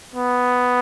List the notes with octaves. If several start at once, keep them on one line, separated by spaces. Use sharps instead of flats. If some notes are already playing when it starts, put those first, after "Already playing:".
B3